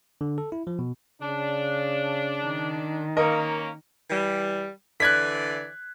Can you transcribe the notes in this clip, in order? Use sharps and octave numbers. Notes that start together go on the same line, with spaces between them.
D3
A4
E4
F3
B2
C#3 D4
D#3
A#3 C#4 A#4 D#5
E3 G3
D3 E3 D5 F#6 G#6 B6